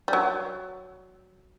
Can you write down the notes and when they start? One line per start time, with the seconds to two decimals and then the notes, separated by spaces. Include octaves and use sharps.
0.08 G3
0.13 F#3